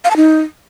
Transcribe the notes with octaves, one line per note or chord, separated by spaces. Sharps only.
F5
A5
D#4